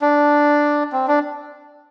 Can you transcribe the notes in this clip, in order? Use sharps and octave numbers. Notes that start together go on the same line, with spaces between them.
D4
C4
D4